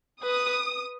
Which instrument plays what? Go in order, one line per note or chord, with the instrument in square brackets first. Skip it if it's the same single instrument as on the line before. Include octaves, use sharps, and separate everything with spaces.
[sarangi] B4 [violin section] D#6